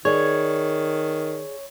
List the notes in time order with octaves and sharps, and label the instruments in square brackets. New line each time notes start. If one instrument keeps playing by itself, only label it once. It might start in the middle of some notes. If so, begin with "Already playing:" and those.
[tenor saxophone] D#3 [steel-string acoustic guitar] G#4 D5 [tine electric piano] C#5